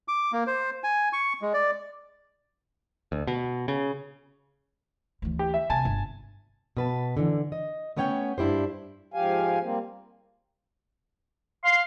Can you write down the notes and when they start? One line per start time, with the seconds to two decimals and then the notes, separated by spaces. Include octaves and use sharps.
0.08 D6
0.32 A#3
0.47 C5
0.84 G#5
1.13 C#6
1.42 G#3
1.54 D5
3.12 D2
3.27 B2
3.68 C#3
5.22 D2 E3
5.39 G4
5.54 E5
5.70 C3 G#5 A5
5.85 G1
6.77 B2 B4 A5
7.17 D3 E3
7.52 D#5
7.97 A3 B3 C#4 C#5 F5 G5
8.38 G2 D4 E4 G4 C5
9.14 G#2 F3 G4 F5 G#5
9.62 G3 A#3 C4
11.64 F5 C6